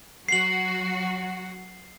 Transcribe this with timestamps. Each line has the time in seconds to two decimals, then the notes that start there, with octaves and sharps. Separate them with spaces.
0.29 F#3 F#4 C7 F#7